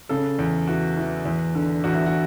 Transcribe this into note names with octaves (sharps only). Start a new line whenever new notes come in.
C#3 A4
E2
E3 F#4
E3
E2
D3
E2 F#4
E4
F#4